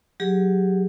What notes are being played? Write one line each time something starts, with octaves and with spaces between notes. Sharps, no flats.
F#3 G4 G#4